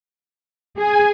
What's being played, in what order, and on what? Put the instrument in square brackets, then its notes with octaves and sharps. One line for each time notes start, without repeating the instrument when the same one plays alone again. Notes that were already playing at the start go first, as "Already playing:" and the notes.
[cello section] G#4 [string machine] G#5